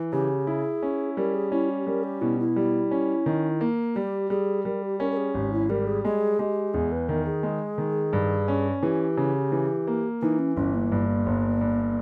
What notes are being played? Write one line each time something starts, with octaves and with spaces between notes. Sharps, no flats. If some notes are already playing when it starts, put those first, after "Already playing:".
Already playing: E3
C#3 G4
E4 G#4
C#4
G3 A#4
G#4
C#4 E4
G4
G3 A#4
G4
B2 E4
E4
G3
C#4
D#3
A#3
G3 G4
G3 G#4
G3 A#4
G4
C#4 A#4
A#4
G#4
G#1 G4
E4
G3 A#4
G#4
G#3 G#4
G#3 G4
E2 G#4
B4
D#3 A#4
G#4
G#3
D#3
G2
C#4
E3 G4 G#4
C#3
E3
A#3
E3 D#4
C#4
G1 C#4
A#3
G2
G1
G2